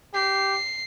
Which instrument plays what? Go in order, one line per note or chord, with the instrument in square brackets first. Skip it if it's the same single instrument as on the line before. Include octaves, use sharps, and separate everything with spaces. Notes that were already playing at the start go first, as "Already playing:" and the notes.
[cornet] G4 [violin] C7